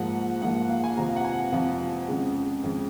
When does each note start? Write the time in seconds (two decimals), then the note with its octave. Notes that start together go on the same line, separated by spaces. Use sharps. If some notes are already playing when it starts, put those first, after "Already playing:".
Already playing: G#2 F3 A#3 F#5
0.42 G#2 F3 A#3 F#5
0.55 F#5
0.69 F5
0.84 G#5
0.97 F2 C3 F3 A#5
1.08 F5
1.16 F#5
1.24 G#5
1.52 F2 C3 F3 F5
2.08 F2 C#3 G#3
2.64 F2 C#3 G#3